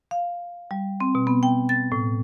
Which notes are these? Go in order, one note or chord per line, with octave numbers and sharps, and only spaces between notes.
F5
G3
C4
B2
B3
G5
A6
A2